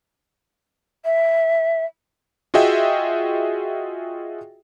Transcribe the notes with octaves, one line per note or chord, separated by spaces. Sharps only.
E5
F4 F#4 G#4 D#5 E5 G5